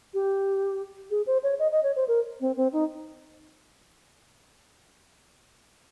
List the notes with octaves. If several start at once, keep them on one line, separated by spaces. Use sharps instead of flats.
G4
G#4
C5
C#5
D#5
D#5
C#5
C5
A#4
C4
C4
D#4